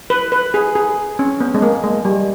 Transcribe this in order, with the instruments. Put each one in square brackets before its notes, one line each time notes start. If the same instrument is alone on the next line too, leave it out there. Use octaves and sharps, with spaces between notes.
[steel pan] B4
B4
G#4
G#4
C#4
B3
G#3
A#3
G#3
G3